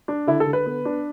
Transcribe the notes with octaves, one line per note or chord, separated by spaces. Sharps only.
D4
D3 E4
A4
D3
B4
B3
D4